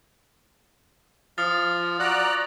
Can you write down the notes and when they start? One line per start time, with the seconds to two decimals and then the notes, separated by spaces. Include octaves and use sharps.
1.38 F3 D#6 F6 A6
2.00 F#4 D5 A#5 F#6